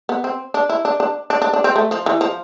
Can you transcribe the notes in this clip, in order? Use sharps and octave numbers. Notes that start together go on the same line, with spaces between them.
B3
C4
D4
E4
D4
D4
D4
D4
D4
C4
A3
F3
E3
F3